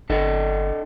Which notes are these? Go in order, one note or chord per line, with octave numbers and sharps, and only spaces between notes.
G1 D4 A4 D#5